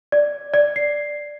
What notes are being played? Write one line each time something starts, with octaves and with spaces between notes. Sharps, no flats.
D5
D5
C7